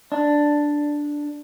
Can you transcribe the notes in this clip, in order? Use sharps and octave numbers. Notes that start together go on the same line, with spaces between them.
D4